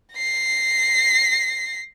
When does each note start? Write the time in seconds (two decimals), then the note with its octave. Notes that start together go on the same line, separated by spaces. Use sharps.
0.15 A#6 C7